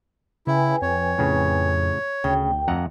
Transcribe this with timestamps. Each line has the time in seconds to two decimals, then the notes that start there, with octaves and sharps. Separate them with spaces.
0.47 C#3 E4 B4 G5 G#5
0.82 F2 C#5
1.18 F2 A2 C#3
2.24 D2 C#3 G5
2.68 F2 F#5 A#5